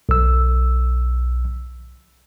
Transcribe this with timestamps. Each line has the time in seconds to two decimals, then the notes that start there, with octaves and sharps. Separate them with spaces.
0.09 B1 E6